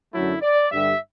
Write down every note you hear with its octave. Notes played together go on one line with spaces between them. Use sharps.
F#2 D3 F#3 A3 E4
D5
G2 D3 G3 E5